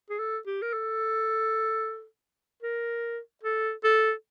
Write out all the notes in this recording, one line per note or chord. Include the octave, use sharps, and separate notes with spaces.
G#4
A4
G4
A#4
A4
A#4
A4
A4